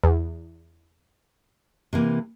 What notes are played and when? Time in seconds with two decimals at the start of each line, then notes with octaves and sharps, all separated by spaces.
0.04 E2
1.93 C3 E3 A#3